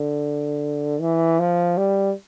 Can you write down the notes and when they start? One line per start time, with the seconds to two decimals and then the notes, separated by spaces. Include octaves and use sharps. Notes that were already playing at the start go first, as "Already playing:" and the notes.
Already playing: D3
1.01 E3
1.39 F3
1.77 G3